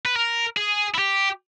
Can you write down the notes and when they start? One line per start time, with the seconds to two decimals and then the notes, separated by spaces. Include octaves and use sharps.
0.05 B4
0.15 A#4
0.57 G#4
0.94 E4
0.99 G4